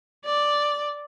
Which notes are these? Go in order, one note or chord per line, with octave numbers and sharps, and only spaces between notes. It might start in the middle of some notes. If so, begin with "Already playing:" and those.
D5